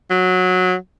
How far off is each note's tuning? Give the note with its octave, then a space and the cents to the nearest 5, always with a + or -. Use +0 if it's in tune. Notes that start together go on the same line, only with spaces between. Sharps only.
F#3 -15